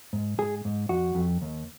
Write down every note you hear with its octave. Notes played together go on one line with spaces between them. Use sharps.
G#2
G#2 G#4
G#2
F2 F#4
F2
D#2